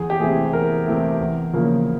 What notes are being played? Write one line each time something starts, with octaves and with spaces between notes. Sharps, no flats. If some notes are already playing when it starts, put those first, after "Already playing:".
Already playing: E2 G#4
G4
C3 E3 A3 G#4
E2 A#4
C3 E3 A3
E2
C#3 F3 A#3